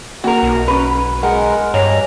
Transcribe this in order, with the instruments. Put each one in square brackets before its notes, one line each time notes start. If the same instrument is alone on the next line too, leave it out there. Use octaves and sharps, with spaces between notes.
[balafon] A#3 [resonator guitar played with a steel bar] F#4 A#4
[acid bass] B1
[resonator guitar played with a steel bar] C#4 B4
[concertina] G#3 A#4 [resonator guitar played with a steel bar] F#5
[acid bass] G2 [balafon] C#5 D#5 G#5 [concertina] A#5